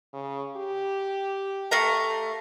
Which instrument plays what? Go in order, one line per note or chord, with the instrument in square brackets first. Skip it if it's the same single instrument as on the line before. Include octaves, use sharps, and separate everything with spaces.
[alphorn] C#3
G4
[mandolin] A3 F5 A#5